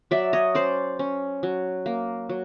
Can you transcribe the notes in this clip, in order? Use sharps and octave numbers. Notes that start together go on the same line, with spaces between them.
F#3 D5 E5
C#5 D#5
C#4 C5 D5
C#4
F#3
A#3
F#3